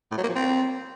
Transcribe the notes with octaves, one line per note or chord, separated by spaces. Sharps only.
A2
F#3
A#3
F3
C4